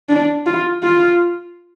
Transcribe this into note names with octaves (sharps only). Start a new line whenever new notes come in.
D4
F4
F4